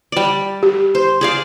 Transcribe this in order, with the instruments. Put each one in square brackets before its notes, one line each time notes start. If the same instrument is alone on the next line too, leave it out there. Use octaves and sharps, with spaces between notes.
[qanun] G3 D5
[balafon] G4
[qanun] C5
G#4 D5 F5